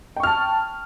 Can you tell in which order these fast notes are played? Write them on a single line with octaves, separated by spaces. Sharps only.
G5 C#6 F6 A5